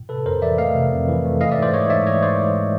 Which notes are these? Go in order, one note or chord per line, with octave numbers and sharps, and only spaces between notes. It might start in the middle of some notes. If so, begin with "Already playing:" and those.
Already playing: A2
C3 A4 B4
F2 A#4 C5
E3 D5 E5
A3 D#5 F5
C3
F2
E3
A3
E3 D#5 F5
D5 E5
G#2
C5 D5
G#3 C#5 D#5
G#2 D5 E5
E3 C#5 D#5
G#2 C5 D5
G#3